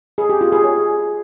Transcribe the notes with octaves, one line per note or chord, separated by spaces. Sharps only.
G#4
G4
F4
G#4
C#5